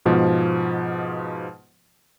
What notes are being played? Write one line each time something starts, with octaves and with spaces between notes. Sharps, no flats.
G#2 B2 F3